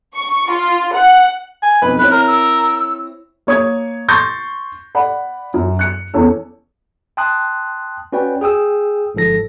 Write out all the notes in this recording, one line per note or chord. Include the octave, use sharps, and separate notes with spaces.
C#6
F4
F#5
G#5
B1 F2 B4
C4 E4 C#5 B5 F#6
A#4 F6
E6
A#3 C#5 D#6 G#6
C6 C#6 G6 A6 A#6
D5 F#5 B5
F#2
F#6 C#7
E2 C#4 A4
G5 A5 C6 D#6 F#6
C#4 F#4 B4 D5 G5
G#4 G5 D#6 E6
G1 G#2 F3 A4 A#6